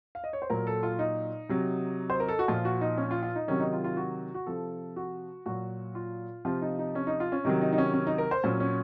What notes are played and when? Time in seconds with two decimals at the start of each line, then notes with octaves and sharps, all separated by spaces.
0.15 F5
0.24 D#5
0.33 C#5
0.42 C5
0.50 A#2 F#3 A#4
0.67 A4
0.83 F4
0.99 D#4
1.49 C3 F#3
2.10 C5
2.20 A#4
2.29 A4
2.39 F#4
2.48 A#2 F3 F4
2.65 F#4
2.81 D#4
2.98 C#4
3.11 F4
3.23 F4
3.36 D#4
3.48 C3 D#3 F#3 C#4
3.60 D#4
3.73 F4
3.84 F4
3.97 F#4
4.34 F#4
4.46 C3 F3 A4
4.96 F#4
5.46 A#2 F#3 F#4
5.95 F4
6.45 C3 F3 F4
6.62 D#4
6.79 D#4
6.95 C#4
7.07 D#4
7.20 F4
7.32 C#4
7.44 C3 D#3 F#3 D#4
7.61 D#4
7.73 D#4
7.78 C#4
7.94 C#4
8.07 D#4
8.18 A#4
8.31 C5
8.44 A#2 F#3 C#4
8.60 C#4